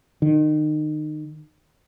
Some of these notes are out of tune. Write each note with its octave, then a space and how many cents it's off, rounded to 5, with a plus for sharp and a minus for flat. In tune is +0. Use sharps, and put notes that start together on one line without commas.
D#3 -30